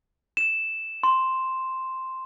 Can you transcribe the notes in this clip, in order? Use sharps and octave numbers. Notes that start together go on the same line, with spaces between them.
E7
C6